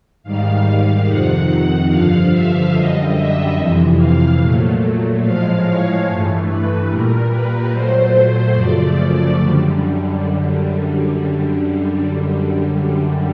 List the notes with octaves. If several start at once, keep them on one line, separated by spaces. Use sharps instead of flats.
G#2 D#3 G3 F5
F2 C3 D#3 F#5
G2 D3 F3 F5
E5
F#2 D3 G3 D#5
E5
F2 C3 E3
F5
A#2 F#3 A3
A2 F3 G#3 F5
C#5
G2 E3 A3
B4
A#2 G3 A#4
B4
A#2 F#3 A3 C5
F#2 C#3 F3 A3 D5
F#2 D3 G3